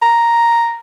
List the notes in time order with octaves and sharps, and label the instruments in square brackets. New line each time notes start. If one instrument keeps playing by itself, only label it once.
[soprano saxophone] A#5